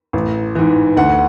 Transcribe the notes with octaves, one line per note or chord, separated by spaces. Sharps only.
A1
G#2 E3
D2 F#5